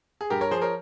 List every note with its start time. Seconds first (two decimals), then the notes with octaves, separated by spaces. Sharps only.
0.21 G#4
0.30 G2 G4 A#4
0.41 A#4 C#5
0.51 F3 G#4 C5
0.61 A#4 C#5